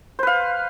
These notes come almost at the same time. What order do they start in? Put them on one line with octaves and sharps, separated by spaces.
C5 B4 F5